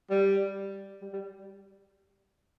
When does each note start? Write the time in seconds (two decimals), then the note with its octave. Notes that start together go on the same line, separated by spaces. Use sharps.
0.10 G3
1.02 G3
1.13 G3